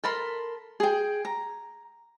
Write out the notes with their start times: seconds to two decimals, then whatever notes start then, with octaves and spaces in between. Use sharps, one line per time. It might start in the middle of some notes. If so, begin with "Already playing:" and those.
0.04 A4 A#4 B5 C6
0.80 G#4 G5
1.25 A#5